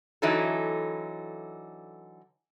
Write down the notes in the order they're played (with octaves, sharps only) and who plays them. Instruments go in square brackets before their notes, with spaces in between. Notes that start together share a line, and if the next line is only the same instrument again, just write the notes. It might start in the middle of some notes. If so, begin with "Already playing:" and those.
[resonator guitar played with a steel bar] D3 E3 F#3 D#4 E4 A4